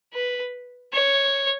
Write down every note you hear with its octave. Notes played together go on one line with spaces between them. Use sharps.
B4
C#5